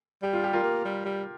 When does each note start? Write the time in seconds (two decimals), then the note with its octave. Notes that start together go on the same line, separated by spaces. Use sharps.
0.22 G3 G4
0.33 F4
0.44 G4
0.53 F4 A#4
0.64 A#3
0.85 G3
1.05 G3